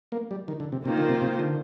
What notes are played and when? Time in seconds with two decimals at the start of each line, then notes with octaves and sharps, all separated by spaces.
0.12 A#3
0.31 G3
0.48 D#3
0.60 D3
0.72 C3
0.85 C3 D#3 A#3 F4 C5
0.98 D3
1.09 C3
1.22 C3
1.39 D3